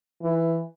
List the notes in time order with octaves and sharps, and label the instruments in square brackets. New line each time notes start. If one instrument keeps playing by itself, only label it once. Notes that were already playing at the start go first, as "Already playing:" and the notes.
[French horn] E3